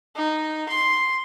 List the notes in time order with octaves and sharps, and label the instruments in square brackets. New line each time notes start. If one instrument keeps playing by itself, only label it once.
[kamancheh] D#4
C6